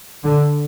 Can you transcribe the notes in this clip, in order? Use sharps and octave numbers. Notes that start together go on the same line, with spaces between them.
D3